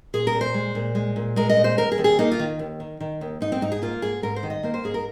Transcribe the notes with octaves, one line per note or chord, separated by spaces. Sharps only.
A#2 G#4
A#4
A#2
C5
G#3
A#2
G#3
A#2
G#3 A#4
D#5
A#2
C5
D#2 A#4
G#4
D#2
G#4
A#3 D#4
F4
D#3
D#2
D#3
D#3
D#2
G#2 D#4
C4
G#2 D#4
G#4
A#3 F4
G#2 G#4
G#2 A#4
C5
D#3
D#5
A#3 C5
C5
G#2 G#4
A#4